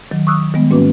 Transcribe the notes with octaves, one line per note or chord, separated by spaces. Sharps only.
D#3 F#3
C#6 D#6 E6 F#6
D#3 G3 G#3 B3
G#2 A#3 C#4 F#4 B4 D6